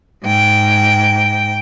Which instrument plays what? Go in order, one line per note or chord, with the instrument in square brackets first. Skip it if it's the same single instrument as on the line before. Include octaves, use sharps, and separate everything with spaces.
[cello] G#2 G5